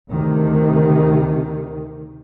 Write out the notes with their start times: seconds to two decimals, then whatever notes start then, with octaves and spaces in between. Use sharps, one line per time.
0.10 D2 C3 D#3